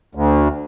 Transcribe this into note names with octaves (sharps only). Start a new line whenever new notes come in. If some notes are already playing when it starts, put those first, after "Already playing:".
D2